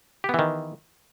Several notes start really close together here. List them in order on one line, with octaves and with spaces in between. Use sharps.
G4 B3 E3 D#3